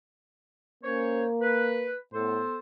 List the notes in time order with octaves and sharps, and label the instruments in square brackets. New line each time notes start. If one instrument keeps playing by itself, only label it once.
[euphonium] A#3 [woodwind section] C#4 C5 C#5
[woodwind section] B4
[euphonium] A2 [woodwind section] B3 A4 C5